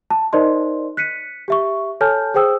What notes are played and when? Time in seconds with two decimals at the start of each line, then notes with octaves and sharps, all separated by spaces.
0.10 A5
0.33 D#4 A#4 C5 D5 D#5 C6
0.97 F#6 B6 C#7 D#7
1.48 G4 E5 C#6
2.01 A4 C#5 G#5 A5 F6 G6
2.34 G#4 C5 G5 D#6 E6